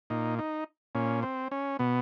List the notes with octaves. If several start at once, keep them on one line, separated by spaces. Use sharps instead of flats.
A#2 D#4
D#4
A#2 C#4
C4
C#4
B2 B3